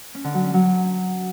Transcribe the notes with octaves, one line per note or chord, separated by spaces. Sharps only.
C#4
D3
F#3
C#4
F#3